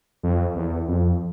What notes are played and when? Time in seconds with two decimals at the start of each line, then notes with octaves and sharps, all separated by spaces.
0.23 F2
0.56 E2
0.88 F2